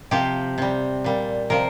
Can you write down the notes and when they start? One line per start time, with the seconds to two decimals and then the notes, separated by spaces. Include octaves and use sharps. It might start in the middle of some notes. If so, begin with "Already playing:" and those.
0.11 C3 F3 G4
0.58 C3 G3
1.04 A#2 G3
1.50 C3 F3 A#4